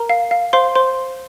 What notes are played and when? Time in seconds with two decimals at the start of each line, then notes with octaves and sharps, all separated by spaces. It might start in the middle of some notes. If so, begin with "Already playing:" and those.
Already playing: A#4 A#5
0.09 F5
0.31 F5
0.53 C5 F5 C6
0.75 C5 C6